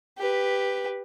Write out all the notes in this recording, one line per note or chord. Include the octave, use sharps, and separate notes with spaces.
G4 B4